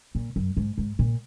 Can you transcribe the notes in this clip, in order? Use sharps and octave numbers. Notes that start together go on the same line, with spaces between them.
A#2
F#2
G#2
G#2
A#2